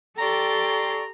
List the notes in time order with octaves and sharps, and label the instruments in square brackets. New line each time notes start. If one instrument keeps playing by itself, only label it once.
[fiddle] G4 C6 [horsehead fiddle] A4 [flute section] D5 G5 C#6 [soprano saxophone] A#5